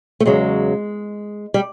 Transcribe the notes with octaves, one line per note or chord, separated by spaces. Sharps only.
A3
E2 C#3 F#3 G#3
G3